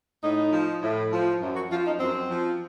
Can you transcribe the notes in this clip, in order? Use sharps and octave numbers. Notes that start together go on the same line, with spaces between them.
A2 D#4
F3
A2
F3
F#2
F#4
F3 F4
D#4
F#2 C4
F3